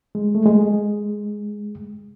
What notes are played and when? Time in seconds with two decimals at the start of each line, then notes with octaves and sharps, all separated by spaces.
0.15 G#3
0.35 A3
0.46 G#3